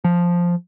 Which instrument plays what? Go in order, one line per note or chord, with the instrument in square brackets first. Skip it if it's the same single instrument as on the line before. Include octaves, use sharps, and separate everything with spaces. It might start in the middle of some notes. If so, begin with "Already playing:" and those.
[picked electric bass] F3